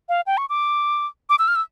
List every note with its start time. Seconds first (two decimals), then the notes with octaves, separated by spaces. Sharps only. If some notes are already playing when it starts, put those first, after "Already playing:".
0.09 F5
0.27 G5
0.37 C#6
0.49 D6
1.30 D6
1.39 E6
1.48 F6
1.55 E6